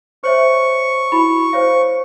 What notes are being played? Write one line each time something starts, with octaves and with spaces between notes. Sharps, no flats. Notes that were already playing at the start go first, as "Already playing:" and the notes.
C5 C#5 E5 C#6
E4 F#4 B5
C5 C#5 F5